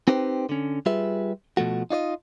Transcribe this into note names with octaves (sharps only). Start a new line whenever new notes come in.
C4 D#4 G4 B4 C5
D3 C#4
G3 F4 G#4 B4 E5
B2 F3 A3 F#4
D#4 F4 D5 D#5